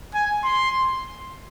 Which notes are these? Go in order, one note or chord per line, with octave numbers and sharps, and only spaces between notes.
G#5
C6